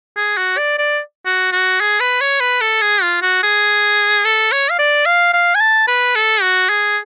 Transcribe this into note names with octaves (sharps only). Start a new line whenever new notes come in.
G#4
F#4
D5
D5
F#4
F#4
G#4
B4
C#5
B4
A4
G#4
F4
F#4
G#4
A4
C#5
F5
D5
F5
F5
G#5
A5
B4
A4
F#4
G#4